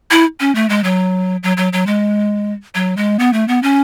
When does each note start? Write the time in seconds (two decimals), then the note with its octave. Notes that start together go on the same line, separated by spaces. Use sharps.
0.11 E4
0.40 C#4
0.55 A3
0.69 G#3
0.84 F#3
1.43 F#3
1.57 F#3
1.73 F#3
1.87 G#3
2.75 F#3
2.97 G#3
3.19 B3
3.33 A3
3.48 B3
3.63 C#4